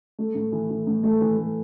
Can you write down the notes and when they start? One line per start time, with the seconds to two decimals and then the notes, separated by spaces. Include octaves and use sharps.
0.19 A3
0.34 A2
0.52 E3
0.70 E3
0.87 A2
1.03 A3
1.21 E3
1.37 A3